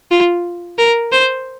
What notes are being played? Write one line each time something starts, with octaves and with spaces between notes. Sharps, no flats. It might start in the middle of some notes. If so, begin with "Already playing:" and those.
F4
A#4
C5